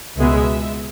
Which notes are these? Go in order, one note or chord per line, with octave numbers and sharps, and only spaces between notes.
C#2 B2 G#3 B3 E5